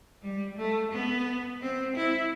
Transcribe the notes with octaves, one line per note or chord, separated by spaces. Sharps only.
G3
A3
B3
C4
E4